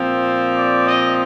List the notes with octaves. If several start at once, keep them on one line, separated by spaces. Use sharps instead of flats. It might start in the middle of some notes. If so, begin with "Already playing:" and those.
Already playing: A#2 F3 C4
D5
D#5